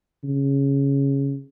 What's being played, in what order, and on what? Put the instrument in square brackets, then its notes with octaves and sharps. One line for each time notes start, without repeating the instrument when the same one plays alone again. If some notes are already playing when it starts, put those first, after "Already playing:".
[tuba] C#3